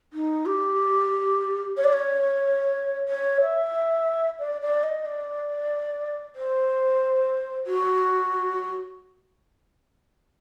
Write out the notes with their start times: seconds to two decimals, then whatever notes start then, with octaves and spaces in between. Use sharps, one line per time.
0.13 D#4
0.46 G4
1.77 C#5
1.84 D5
1.93 C#5
3.08 C#5
3.41 E5
4.39 D5
4.61 D5
4.83 D#5
5.05 D5
6.36 C5
7.67 F#4